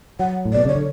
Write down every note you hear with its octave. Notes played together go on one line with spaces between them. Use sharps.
F#3 F#5
A2
B2 D5
C#3 C#5
D3